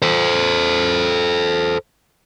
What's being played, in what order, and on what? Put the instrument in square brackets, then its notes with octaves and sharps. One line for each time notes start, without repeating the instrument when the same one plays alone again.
[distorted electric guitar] A4 C5